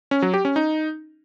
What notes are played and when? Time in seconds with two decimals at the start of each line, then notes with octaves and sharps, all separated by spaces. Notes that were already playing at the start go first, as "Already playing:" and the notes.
0.11 C#4
0.22 F#3
0.34 G4
0.45 C#4
0.56 D#4